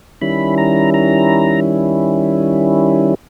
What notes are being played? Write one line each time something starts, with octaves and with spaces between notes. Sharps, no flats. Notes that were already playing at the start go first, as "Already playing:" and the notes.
D#3 G3 C#4 E4 B5
A#5
A#5